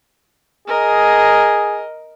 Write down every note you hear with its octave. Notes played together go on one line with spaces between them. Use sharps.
G#4 A#4 D#5